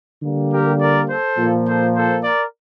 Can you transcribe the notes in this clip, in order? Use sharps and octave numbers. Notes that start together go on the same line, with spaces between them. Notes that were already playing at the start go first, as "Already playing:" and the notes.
D3 G3 A#3
G4 A#4
A#4 D5
A4 C5
A#2 F3 A#3
A4 C5
A4 C5
A#4 D5